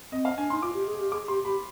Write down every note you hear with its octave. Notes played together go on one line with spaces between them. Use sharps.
C4 D#5
F5
D4 G#5
D#4 C6
F4 D6
G4
G#4
G4
G#4 D6
G4 C6
G4 B5